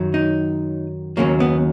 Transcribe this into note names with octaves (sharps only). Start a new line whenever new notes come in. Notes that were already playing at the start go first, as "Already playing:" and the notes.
Already playing: F#2 D#3 F#3
D#4
D#2 C#3 F#3 A#3
B3